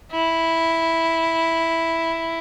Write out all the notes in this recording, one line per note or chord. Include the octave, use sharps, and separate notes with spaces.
E4